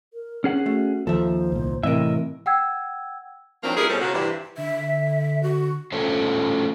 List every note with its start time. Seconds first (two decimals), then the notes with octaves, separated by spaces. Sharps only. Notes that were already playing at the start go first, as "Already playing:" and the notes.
0.14 A#4
0.44 C#4 G#4 F#5
0.66 A3 F#4
1.07 D#2 F3 A4 C5 E5
1.52 C2 A#2
1.83 A2 C3 E3 C4 A#4 D#5 E5
2.46 F#5 G5 E6 G#6
3.62 D#3 F3 F#3 A#3 C4 D4
3.76 A#2 G3 E4 G#4 A#4 B4
3.89 B2 G3 C#4 A4 C5
4.00 A#2 C#3 F#4
4.14 G2 C3 E3
4.58 D3 E5
5.43 F#4
5.92 A3 C#4 F4 A4 C5 C#5